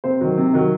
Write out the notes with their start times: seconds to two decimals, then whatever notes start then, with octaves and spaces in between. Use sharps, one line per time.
0.04 C3 C5
0.21 D#3 F#3
0.37 C3
0.53 D#3 F#3